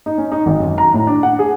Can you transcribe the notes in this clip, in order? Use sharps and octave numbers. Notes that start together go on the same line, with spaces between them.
D#4
C#4
D#4
G#1
F#2
A#5
A2
D4
F#5
G#4